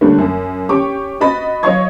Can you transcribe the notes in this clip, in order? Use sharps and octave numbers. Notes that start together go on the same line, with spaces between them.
D3 G3 A3 A#3 C#4
F#2
C#4 G4 G5 C#6 D6
F#4 D#5 B5 A6
F#3 C#5 D#5 F5 C#6 G#6